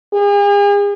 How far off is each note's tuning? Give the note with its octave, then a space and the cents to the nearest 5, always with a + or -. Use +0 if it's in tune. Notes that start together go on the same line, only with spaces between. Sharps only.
G#4 -40